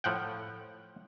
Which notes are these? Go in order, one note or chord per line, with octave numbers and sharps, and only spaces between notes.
A2 F3 F#5 G5